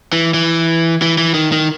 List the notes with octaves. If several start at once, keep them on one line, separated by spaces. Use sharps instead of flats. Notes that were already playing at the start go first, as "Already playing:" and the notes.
E3
E3
E3
E3
D#3
D#3